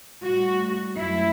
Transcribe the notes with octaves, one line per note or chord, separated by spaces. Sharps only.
A2 G3 F#4
F#2 F#3 A3 E4